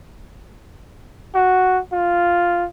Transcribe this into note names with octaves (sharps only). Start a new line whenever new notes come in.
F#4
F4